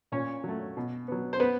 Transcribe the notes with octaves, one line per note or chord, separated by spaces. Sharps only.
A#2 C#4 C#5
F#3 A3
B2
F#3 B3
C5
B3 B4